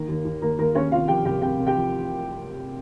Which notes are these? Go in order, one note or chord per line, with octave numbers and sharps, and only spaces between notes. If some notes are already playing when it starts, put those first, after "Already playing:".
Already playing: D#3 A#3
D#2
D#2
D#2 A#3 A#4
D#2 A#3 A#4
D#2 C#4 C#5
C3 F4 F5
F3 G4 G5
C2 G4 G5
C3 G4 G5
C3
G4 G5
F3